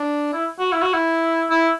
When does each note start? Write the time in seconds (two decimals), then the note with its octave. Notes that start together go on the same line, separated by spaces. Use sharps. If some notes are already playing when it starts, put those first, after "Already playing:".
Already playing: D4
0.33 E4
0.59 F#4
0.72 E4
0.82 F#4
0.93 E4
1.50 E4